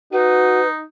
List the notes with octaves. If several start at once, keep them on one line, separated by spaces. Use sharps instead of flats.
D#4 F#4 B4